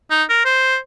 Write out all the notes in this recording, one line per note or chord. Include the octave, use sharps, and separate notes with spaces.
D#4
A#4
C5